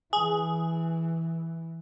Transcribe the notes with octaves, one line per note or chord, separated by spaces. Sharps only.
E3 G#4